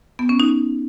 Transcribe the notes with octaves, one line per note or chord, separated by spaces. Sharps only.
B3
C#4
D#4